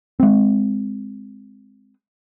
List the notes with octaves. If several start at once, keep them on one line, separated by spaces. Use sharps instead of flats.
G#3 C4